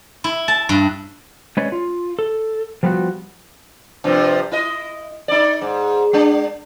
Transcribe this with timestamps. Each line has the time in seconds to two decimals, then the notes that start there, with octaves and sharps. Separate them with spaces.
0.24 E4
0.48 A5
0.69 G2
1.57 G#3 C#4 B4 C#5 D5
1.72 F4
2.19 A4
2.83 F3 G3 B3 F4 F#4
4.04 G2 C3 F3
4.51 E4 D#5
5.28 D#4 D5
5.62 G#2
6.13 G#3 D4